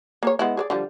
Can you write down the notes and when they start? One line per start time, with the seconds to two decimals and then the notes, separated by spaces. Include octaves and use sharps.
0.23 A#3 G#4 C#5
0.39 G#3 B3 E4
0.57 G#4 C5 D5
0.70 D3 F3 G3